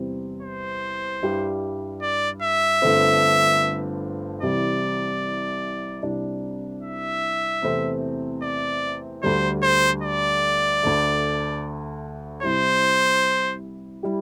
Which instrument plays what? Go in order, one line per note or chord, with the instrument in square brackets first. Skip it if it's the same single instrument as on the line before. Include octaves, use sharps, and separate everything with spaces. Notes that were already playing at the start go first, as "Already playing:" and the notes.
Already playing: [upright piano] E2 C3 G3 C4
[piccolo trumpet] C5
[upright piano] G2 G3 E4 G4
[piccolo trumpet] D5
E5
[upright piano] G1 G2 D3 A3 C4
[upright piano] C2 C3 E3 G3 [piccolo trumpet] D5
[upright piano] C2 C3 G3 D4
[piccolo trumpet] E5
[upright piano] E2 C3 E3 A3 C4
[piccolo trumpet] D5
[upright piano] D2 D3 G3 [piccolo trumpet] C5
[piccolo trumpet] C5
D5
[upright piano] D2 D3 A3
[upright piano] C2 C3 G3 E4 [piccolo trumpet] C5
[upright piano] G3 E4 G4